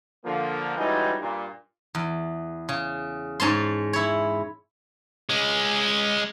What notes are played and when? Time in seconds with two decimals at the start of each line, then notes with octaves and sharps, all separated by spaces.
0.25 D3 F3 A#3
0.77 E3 G3 G#3 C#4 D#4 F#4
1.20 G2 A#2
1.95 E2
2.69 C#3
3.40 G#2 C#4 A5 C6
3.93 E4 C#5
5.29 G#3 C#4